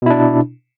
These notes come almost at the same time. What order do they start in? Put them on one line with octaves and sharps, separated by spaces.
B2 E4 D4